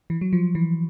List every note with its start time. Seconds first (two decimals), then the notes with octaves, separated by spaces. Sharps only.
0.10 E3
0.21 F#3
0.33 F3
0.55 E3